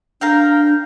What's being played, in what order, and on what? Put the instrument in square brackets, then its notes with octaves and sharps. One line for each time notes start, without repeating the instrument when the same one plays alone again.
[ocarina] D4 [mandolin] A#4 F5 G5